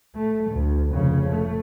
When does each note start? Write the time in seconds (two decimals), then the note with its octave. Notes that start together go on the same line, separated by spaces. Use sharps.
0.15 A3
0.51 D2
0.91 F1 C#3
1.30 A3